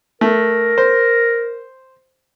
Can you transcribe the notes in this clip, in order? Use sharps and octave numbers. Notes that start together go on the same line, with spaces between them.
A3 A#4
C5